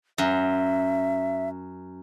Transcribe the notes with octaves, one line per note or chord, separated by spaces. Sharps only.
F#2 E5